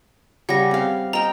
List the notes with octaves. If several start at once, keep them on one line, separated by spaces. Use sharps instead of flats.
C#3 G3 F#5 A#6
C4 F5
D#5 G5 A#5